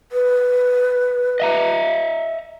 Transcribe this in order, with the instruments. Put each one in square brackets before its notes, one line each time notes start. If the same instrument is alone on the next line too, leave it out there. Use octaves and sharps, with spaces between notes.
[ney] B4
[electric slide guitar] D#5 E5 A#5